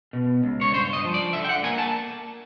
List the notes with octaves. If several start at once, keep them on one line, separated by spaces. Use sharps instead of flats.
B2
C#2
C#5
G2 C5
D#5
F3
D5
D3 E5
G5
F#5
A#3 G#5
A5